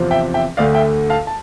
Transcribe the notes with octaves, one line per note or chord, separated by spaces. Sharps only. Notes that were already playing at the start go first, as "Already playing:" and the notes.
Already playing: E2 C3 F3 C4
E5 G5
E5 G5
D2 D3 A3 D5 F5
E5 G5
F5 A5
A5